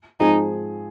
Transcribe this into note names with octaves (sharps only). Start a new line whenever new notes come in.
G#2 F3 G#3 C4 D#4 G#4